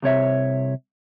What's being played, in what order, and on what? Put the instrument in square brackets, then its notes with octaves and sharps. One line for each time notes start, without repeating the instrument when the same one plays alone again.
[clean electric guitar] C2 C3 C#5 E5